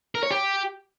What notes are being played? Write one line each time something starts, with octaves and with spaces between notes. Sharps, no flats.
A#4
C#5
G4